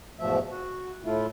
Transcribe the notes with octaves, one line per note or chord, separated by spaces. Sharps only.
E2 G#2 B2 F3 A3 E5
F#4
A2 A3 E4 F4